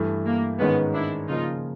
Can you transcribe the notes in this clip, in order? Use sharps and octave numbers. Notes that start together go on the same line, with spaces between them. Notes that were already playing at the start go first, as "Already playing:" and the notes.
Already playing: G2 E3 A3
A#3
G#2 D#3 G#3 B3 C#4
D4 E4
C#3 F3 A#3 D#4 F4